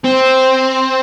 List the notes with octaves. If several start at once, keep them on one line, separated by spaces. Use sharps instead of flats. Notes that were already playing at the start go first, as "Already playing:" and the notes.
C4